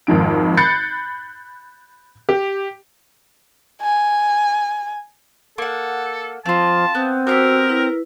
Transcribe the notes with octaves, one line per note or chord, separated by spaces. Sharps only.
G#1 F2 G#2 D7
B5 F#6 G6 A6 C7 C#7
G4
G#5
A#3 A4 F#5
F3 C4 F4 F5 A5
B3 C4
B3 D4 F#4 G4 A#4 C5 E6
E4 B4